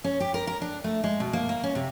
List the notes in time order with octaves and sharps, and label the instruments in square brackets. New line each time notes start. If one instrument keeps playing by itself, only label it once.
[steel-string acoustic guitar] C#4
G4
A#4
A#4
D4
A3
G#3
B2
A#3
A#3
C#4
C3